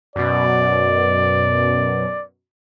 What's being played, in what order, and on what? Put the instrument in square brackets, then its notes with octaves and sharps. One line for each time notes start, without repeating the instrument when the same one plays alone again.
[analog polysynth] F#2 B2 [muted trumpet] D5